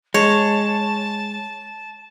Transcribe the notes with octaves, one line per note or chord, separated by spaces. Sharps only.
G#3 C#5 A5